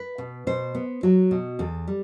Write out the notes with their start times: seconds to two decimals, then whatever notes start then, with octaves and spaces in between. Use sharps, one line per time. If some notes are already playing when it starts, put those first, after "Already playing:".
Already playing: B4
0.18 B2
0.47 B2 C5
0.75 B3
1.03 F#3 F#4
1.31 B2
1.59 E2 A4
1.87 G3